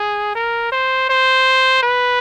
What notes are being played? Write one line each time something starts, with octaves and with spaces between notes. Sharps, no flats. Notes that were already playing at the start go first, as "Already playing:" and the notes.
Already playing: G#4
A#4
C5
C5
B4